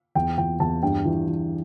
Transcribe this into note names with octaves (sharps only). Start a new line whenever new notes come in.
E2 G5
E2 G5
E2 A5
G2 G5
E3
E3